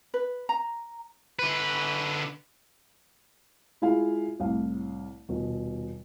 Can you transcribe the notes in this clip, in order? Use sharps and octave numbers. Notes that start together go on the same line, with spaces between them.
B4
A#5
D3 B4
G#3 E4 F4 G#4 F5
C2 A2 F5
D#1 B2